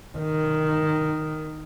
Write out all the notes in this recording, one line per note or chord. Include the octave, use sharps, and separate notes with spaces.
D#3